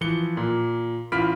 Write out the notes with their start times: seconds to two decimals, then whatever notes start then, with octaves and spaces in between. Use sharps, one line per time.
0.01 E3 F3 C#7 G7
0.37 A#2
1.12 A1 F4 B5 F6 B6 D7